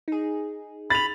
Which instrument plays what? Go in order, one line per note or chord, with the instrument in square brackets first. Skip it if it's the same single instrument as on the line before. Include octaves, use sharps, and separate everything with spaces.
[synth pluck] D#4 G#4
[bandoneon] B5 [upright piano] A6 F7